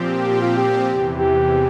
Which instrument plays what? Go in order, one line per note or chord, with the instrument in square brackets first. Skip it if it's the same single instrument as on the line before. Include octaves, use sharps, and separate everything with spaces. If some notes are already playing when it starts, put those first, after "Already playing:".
Already playing: [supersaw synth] A#2 F3 C4 G4
[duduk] G4
F4
G4
[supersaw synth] E2 C3 E3
[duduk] G4